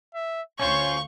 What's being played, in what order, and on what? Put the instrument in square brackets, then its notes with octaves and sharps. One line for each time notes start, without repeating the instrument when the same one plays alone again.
[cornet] E5
[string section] D2 F5 G6 [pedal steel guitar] C#4 F4 C5 [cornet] C#5 [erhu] C#6